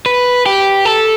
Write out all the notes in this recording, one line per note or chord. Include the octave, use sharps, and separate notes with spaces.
B4
G4
A4